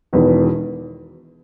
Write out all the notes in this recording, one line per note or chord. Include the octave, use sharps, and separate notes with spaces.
E1 E2 D#3